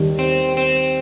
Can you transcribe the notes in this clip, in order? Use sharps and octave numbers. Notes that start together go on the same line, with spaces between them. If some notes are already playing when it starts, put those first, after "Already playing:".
Already playing: D#2 D#3 G3
C4
C4